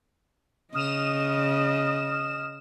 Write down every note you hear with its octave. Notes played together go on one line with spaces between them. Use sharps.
C#3 D#5 D#6 F6 E7